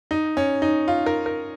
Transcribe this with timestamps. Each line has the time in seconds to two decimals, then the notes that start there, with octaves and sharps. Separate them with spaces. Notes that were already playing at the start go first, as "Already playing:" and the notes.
0.11 D#4
0.37 C#4
0.62 D#4
0.88 F4
1.06 A#4
1.26 A#4